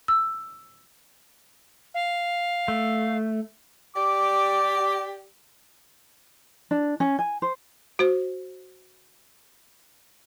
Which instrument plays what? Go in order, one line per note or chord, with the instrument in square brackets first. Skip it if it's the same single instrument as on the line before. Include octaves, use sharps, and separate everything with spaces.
[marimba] E6
[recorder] F5
[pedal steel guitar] A3
[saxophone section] G4 D5 [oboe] D6
[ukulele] D4
C#4
G#5
C5
[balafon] F#4 C5